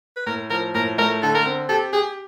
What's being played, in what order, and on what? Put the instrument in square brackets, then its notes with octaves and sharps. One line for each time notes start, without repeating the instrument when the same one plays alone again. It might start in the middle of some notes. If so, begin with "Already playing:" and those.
[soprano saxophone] B4
[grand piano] A2 [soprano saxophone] A#4
[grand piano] F3 [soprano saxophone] A#4
[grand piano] A2 [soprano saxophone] A#4
[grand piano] A3 [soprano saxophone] A#4
[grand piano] D3 [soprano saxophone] A4
[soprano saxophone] A#4
[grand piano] C4
[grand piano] G4 [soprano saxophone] A4
[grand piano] G4 [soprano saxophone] G#4